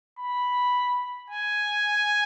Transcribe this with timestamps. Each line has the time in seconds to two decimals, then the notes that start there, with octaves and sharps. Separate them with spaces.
0.19 B5
1.30 G#5